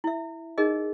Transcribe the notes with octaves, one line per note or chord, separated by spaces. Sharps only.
E4 E5
D#4 G#4 A#4 D#5